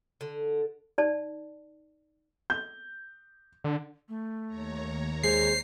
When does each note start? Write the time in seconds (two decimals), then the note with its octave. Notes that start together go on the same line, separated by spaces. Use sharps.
0.21 D3
0.98 D#4 D5 A5
2.50 G6
3.64 D3
4.09 A3
4.47 D#2 C#5 A#5
5.23 G#3 G#4 C5 C7